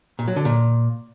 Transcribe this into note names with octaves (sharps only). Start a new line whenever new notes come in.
A#2
F#3
D3
A#2